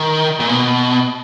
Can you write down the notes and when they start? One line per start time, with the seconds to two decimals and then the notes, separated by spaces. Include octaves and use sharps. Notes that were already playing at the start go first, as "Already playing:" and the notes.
Already playing: D#3
0.40 A#2
0.49 B2